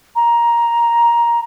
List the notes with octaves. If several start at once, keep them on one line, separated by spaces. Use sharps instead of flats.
A#5